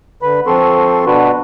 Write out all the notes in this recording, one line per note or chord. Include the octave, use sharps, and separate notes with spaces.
D3 B4 B5
F3 C4 A4 C6 C#6
B2 D4 F#4 B4